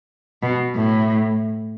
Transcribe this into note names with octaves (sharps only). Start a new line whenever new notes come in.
B2
A2